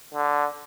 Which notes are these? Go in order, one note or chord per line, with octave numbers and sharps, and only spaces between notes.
D3